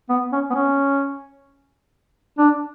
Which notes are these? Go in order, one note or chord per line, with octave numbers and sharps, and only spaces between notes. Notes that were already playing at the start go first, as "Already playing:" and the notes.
B3
C#4
B3
C#4
D4